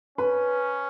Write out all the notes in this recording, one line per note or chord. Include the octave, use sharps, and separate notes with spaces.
C#4 B4